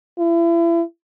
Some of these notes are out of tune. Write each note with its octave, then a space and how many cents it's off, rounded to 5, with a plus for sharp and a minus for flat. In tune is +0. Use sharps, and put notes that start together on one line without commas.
E4 +35